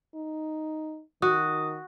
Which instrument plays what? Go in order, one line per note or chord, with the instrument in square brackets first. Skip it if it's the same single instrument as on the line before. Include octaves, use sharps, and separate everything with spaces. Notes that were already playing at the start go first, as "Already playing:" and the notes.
[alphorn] D#4
[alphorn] D#3 [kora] F#4 [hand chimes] D#6